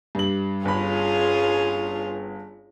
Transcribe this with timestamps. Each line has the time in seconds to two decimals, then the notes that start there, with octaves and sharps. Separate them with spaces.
0.15 G2 F#7
0.65 G1 C#4 F4 G#4 B5